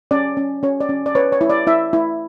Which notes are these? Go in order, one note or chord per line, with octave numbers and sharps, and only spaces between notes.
C#4 D5
C#4
C#4 C#5
D5
C#4
D5
B4 C#5
C#5
E4
D5
E4 E5
E4